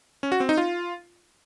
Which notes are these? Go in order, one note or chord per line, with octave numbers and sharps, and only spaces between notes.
C#4
F#4
C4
D#4
F4